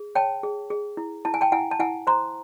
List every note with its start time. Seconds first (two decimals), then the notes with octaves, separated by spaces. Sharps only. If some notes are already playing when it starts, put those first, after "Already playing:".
Already playing: G#4
0.15 C#5 G5 A5
0.43 G#4
0.70 G#4
0.97 E4
1.25 E4 A5
1.34 G#5
1.41 G5 A5
1.52 E4 F#5 G#5
1.71 A5
1.79 E4 F#5 G#5
2.07 C5 A#5 C6